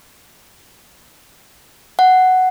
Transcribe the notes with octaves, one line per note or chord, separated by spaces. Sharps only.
F#5